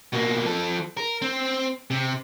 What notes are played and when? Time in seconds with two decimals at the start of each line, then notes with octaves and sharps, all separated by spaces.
0.13 B2 A#3
0.46 F3 A4
0.97 A#4
1.22 C4
1.90 C3